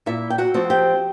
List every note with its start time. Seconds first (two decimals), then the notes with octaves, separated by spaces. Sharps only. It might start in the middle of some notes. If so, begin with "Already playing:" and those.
0.06 A#2 E4 E5
0.30 G5
0.38 F#4 F#5
0.54 F3 A3 C4
0.70 G4 G5